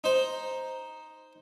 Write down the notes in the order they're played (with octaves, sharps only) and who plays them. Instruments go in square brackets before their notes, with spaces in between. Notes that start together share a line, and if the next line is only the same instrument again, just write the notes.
[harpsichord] D#4 C5